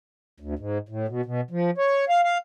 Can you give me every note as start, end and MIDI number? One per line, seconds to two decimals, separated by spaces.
0.40 0.54 38
0.59 0.78 44
0.89 1.06 45
1.08 1.21 47
1.25 1.41 47
1.51 1.71 53
1.78 2.05 73
2.09 2.21 77
2.24 2.38 77